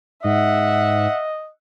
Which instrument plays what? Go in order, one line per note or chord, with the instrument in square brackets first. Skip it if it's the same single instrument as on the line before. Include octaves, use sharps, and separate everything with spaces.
[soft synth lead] G#2 [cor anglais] D#5 [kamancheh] E5 F#5